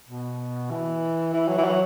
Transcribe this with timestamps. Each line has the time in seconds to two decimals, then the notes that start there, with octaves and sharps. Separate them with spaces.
0.09 B2
0.71 E3
1.34 E3
1.48 F#3
1.58 E3
1.64 F#3